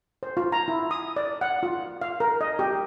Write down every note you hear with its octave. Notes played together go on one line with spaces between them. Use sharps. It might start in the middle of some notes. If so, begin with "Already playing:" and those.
C5
F4
A#5
E4
D#6
D5
F#5
F4
F5
A#4
D#5
G4